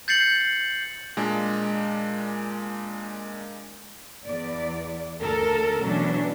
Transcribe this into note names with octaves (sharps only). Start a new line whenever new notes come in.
G6 A6 C7 C#7 F#7
A#2 G#3 D4
E2 D5
D2 C#3 A4 A#4
B2 E3 F#3 C#4 D4